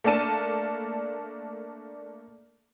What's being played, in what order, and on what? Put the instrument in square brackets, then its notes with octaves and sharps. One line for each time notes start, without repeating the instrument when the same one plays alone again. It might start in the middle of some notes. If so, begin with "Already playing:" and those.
[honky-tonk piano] A3 A#3 D4 A5 D#7